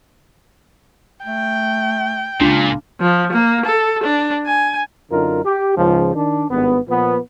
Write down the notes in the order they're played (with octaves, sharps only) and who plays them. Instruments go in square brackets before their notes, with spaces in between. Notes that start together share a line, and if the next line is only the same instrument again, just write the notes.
[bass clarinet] A3 [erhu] G5
[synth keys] C#2 D4 F4 [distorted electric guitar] A#2 [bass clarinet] C#3
[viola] F3
A#3
A4
D4
G#5
[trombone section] F#2 D3 D#4 F4 A#4
G4
C#2 G#2 C#3 F3
D#3 D4
G#1 G2 B3
A#2 F3 B3